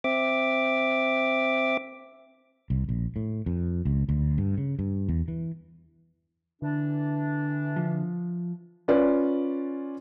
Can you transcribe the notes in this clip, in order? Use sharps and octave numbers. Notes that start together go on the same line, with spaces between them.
C4 E5 D6
C2
A#1
A2
F2
C#2
D2
G2
C#3
G2
E2
E3
D3 E3 D4
F3
C#4 F4 B4 D5